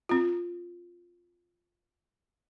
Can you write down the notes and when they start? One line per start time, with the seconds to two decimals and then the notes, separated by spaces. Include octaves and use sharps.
0.09 C4 F4